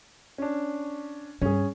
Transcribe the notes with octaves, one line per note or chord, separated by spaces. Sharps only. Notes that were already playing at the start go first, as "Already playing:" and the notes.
C#4 D4
G2 G3 C#4 G#4